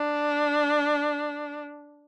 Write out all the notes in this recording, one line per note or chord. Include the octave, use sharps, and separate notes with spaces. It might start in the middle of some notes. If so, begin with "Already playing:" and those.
Already playing: D4